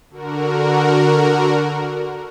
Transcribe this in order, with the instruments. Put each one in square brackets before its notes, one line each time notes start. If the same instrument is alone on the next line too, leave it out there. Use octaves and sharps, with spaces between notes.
[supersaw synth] D3 F#4 A#4